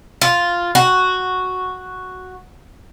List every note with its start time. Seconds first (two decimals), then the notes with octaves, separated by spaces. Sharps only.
0.22 F4
0.75 F#4